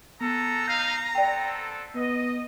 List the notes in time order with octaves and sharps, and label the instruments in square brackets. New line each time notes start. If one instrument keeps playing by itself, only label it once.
[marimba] B3 [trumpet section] F#4 G#4 A4 [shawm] A#5
[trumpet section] D#4 F5 [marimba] G6
[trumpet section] B3 C4 A4 [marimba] D5 G5
[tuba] B3 [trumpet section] D#5